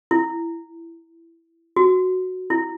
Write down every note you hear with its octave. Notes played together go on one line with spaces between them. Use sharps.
E4
F#4
E4